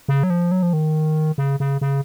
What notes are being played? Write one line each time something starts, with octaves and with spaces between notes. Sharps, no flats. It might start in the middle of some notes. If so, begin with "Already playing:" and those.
C#3
F#3
F3
F#3
F3
D#3
C#3
C#3
C#3